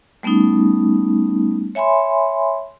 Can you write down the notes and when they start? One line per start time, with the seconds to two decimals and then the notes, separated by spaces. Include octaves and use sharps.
0.23 G3 A3 B3 C#4 D#4
1.75 C#5 E5 G#5 B5 C6